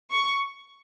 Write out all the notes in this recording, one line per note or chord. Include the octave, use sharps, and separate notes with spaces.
C#6